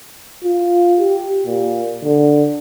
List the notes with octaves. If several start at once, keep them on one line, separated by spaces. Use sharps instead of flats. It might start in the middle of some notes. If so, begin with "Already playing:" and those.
F4
G4
A#2
D3